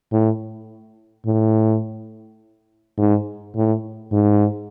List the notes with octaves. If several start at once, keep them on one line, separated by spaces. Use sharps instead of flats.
A2
A2
G#2
A2
G#2